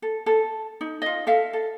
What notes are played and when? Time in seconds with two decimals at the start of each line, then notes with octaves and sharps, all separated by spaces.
0.02 A4
0.26 A4
0.81 D#4
1.02 F4 D#5
1.27 A4 E5 F5
1.53 A4